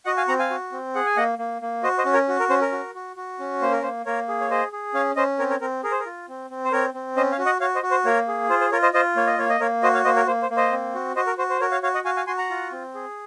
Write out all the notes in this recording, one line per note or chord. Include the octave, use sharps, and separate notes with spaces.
F#4 D#5 F#5
F5 G#5
C4 F#5 A#5
F5 G#5
F#4
C4
G#4 F#5
G#5
A#3 D#5 F#5
A#3
A#3
F#4 C5 D#5
C5 D#5
C#4
A#4 C#5
F#4
A#4
C#4 C5
A#4
F#4
F#4
F#4
C#4
A#3 C5
A#4
A#3 C5
A#3 A#4 C#5
G#4
C#5
G#4 C5 D#5
G#4
C#4 C#5 F5
C#4 C5 D#5
C4 A#4 C#5
A#4 C#5
C4 A#4
G#4 A#4
C5
A#4
F4
C4
C4
C5
C4 A#4 C#5
C4
C#4 C5 D#5
C#5 F5
F#4
D#5 F#5
F#4 C#5 F5
C5 D#5
F#4
C5
A#3 A#4 C#5
G#4
F4 C5
C5
F4 A#4 C#5
C5 D#5
F4 C5 D#5
A#3 C#5
D#5
A#3 C#5
D#5
A#3 A#4 C#5
F#4 C5 D#5
C#5 F5
A#3 C5 D#5
A#4 C#5
A#3 C5
C5
A#3
C5 D#5
C4
F#4
F#4 C5 D#5
A#4
F#4 C5
C5
F#4 A#4 C#5
C#5 F5
F#4 C#5 F5
D#5 F#5
F#4 F5 G#5
F5 G#5
F#4 G#5 C6
F#5 A#5
F4
C4
G#4